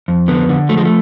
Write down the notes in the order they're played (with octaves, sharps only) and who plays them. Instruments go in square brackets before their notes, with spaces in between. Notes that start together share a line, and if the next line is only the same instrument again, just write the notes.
[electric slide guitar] F2
D3 B3
D3
F3 A3
G#3
A3